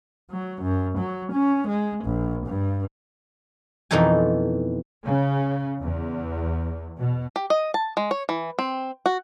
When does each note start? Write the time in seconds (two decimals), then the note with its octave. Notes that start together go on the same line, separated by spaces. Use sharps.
0.31 F#3
0.62 F#2
0.98 F#3
1.32 C#4
1.68 G#3
2.05 A#1
2.47 G2
3.91 F2 B2 E3 D#4 A4 G#5
5.05 C#3
5.82 E2
6.99 B2
7.36 G4
7.50 D#5
7.74 A5
7.97 G#3
8.11 C#5
8.29 E3
8.59 C4
9.06 F#4